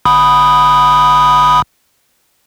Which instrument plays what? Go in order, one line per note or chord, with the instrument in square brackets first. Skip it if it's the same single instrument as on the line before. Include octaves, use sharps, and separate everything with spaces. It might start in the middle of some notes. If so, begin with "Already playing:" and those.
[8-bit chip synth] G1 B5 D#6